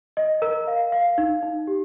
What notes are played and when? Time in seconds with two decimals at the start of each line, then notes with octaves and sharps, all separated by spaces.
0.17 D#5
0.42 A#4
0.67 F5
0.92 F5
1.18 D#4
1.43 D#4
1.67 G4